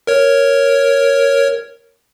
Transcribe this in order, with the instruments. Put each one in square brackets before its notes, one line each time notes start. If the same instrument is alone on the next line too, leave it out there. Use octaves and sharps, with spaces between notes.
[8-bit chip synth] A#4 C#5